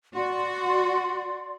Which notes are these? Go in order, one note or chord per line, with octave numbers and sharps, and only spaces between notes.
F#4 D5 C6